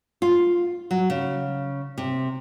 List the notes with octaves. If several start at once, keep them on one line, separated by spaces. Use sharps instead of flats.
F4
F#3
C#3
C3